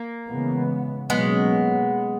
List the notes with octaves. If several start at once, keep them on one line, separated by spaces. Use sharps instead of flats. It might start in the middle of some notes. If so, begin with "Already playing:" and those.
Already playing: A#3
C#3 E3 G#3 B3
B2 F#3 G#3 A#3 B3 C#4